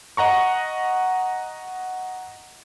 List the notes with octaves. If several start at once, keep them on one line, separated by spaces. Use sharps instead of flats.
D#5 F#5 A#5 C#6